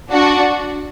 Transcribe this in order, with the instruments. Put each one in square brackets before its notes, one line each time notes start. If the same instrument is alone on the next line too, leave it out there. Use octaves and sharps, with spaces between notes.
[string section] D4 F#4